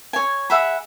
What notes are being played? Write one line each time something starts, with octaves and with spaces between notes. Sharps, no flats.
C#5 G#5
G#4 E5 F#5 B5